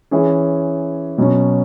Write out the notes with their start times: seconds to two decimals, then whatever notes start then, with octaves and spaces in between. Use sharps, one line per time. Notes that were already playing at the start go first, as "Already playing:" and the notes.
0.11 E3 C#4 G#4
1.18 B2 F#3 C#4